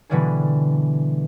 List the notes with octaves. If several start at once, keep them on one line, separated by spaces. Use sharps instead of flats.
B2 D3 E3 G3 D4 G#4